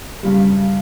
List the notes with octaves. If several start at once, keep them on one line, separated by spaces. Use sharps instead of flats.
G2 C#3 G3